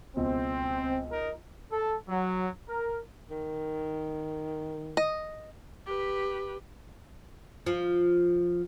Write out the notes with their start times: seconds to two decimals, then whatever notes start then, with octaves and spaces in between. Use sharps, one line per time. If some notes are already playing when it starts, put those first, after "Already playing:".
0.16 C#2 B2 C4
1.11 D#4 A#4
1.71 A4
2.09 F#3
2.68 A#4
3.30 D#3
4.97 D#5
5.86 G4 B4
7.66 F3